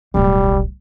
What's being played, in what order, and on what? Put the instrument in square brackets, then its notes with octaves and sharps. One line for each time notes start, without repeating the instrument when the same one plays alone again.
[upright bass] D1 B1 [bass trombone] G3